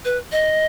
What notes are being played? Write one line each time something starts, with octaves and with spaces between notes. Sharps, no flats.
B4
D#5